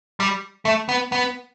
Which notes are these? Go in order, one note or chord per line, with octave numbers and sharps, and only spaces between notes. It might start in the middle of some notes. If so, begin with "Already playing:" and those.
G3
A3
B3
B3